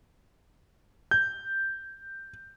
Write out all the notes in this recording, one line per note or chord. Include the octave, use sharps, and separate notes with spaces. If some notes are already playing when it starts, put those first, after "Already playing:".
G6